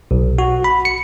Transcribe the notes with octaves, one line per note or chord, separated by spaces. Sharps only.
B1
F#4
B5
C#7